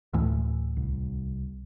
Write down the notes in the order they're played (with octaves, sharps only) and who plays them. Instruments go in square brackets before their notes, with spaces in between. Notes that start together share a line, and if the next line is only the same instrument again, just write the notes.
[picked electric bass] D2 A2 E3
[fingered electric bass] C2